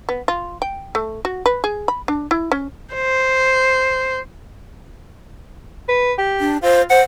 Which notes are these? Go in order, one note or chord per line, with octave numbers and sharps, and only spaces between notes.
B3
F4
G5
A3
F#4
B4
G#4
B5
D4
E4
C#4
C5
B4
G4
D4
F4 C5
C5 F#5